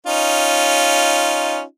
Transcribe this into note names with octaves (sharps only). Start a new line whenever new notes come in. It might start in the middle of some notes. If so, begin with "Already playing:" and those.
C#4 D#4 F4